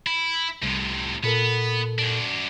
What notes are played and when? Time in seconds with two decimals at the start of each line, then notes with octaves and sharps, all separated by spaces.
0.06 E4
0.63 C2 A2 C3
1.23 A#2 B3 A4 A#4
1.99 F#2 D4